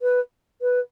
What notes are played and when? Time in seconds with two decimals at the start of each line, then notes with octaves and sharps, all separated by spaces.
0.02 B4
0.62 B4